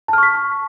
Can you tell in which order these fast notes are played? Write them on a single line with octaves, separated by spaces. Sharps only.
A5 F6 C#6 B6